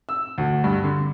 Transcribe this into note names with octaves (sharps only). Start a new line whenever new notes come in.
E6
D2
G2
D3